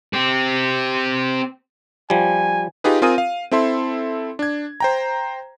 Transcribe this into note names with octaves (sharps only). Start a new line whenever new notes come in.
C4 G4
F3 G3 G#5
D#4 F4 G4 G#4 B4
C4 F4 A#4 G#5 D#6 D#7
F5
C4 E4 A4 E5 C6
D4 G#6
C5 G5 A#5